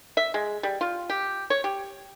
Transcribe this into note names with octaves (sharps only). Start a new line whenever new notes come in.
E5
G#3
G3
F4
G4
C#5
G4